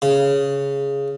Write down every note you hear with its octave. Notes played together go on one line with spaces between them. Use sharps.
C#3